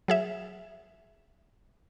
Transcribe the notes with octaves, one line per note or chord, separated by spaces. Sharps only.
F#3 G#4 E5